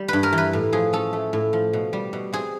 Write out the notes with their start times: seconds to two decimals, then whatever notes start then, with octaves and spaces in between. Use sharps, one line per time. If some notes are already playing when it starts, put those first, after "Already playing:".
Already playing: G3
0.08 G2 B4
0.23 A#4
0.33 E3
0.38 B4
0.53 A2
0.73 F3 G#4
0.93 C#4 A4
1.13 A3
1.33 A2
1.53 F3
1.73 B2
1.93 G3
2.13 B2
2.33 C4 G#4